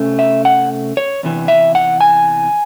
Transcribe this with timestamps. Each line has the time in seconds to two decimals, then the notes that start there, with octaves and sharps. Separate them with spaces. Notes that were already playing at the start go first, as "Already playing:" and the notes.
Already playing: C3 A3 C#4
0.19 E5
0.45 F#5
0.97 C#5
1.23 E2 C3 E3
1.48 E5
1.75 F#5
2.01 G#5